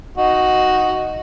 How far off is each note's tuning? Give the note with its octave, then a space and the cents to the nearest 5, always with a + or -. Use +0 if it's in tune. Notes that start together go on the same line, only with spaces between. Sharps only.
D#4 +0 F#4 +0